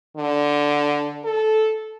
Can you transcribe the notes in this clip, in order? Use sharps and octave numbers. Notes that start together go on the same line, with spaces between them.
D3
A4